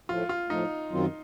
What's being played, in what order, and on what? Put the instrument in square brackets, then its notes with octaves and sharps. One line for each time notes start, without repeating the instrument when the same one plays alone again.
[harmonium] A2 F3 A3 [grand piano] F4
[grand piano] F4
[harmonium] A2 F3 A3 [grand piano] D#4
[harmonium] F#2 D#3 F#3 C4 F4